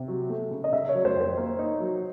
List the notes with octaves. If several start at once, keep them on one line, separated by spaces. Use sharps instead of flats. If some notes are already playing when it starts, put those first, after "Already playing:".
Already playing: C3
F#3
A3
C#3
D#5
C#3 E5
C#5
F#3
C5
F2
C5
A#3
D#4
F#3